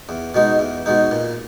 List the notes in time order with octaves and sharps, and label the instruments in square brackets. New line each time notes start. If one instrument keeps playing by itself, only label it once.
[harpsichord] E2
B2 G#3 D#4
E2
B2 G#3 D#4
A#2